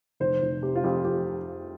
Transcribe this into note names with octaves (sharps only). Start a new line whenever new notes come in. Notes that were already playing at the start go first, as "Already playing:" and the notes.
F1 C5
F1
C3 G4
F4
F2 G4
F2 G4